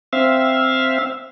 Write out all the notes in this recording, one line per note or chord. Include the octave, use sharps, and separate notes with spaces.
C4 E5 F5